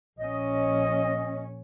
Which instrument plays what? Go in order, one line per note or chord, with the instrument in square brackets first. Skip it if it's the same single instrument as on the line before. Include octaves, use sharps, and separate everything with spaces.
[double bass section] A#1 C#4 [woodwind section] D#5